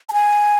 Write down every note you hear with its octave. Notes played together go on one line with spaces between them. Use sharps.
A5
G#5